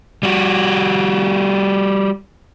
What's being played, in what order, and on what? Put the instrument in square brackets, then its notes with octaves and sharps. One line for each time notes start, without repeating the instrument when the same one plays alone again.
[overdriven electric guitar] G3 F#4